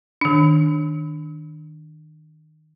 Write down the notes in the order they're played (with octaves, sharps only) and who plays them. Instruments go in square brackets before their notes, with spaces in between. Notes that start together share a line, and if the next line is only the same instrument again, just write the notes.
[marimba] D#3 D4